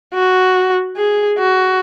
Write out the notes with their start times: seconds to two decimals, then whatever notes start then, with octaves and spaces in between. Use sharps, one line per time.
0.14 F#4
0.97 G#4
1.39 F#4